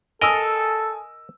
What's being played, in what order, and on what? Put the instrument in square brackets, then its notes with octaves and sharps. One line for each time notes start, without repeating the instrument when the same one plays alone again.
[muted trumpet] A4 [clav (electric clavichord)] A#4 D#5 [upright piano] G#5 D#6 E6